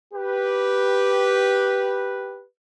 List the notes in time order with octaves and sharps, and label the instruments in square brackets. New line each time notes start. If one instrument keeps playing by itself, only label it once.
[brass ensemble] G4 B4